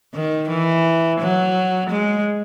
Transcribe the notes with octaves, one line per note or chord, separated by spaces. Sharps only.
D#3
E3
F#3
G#3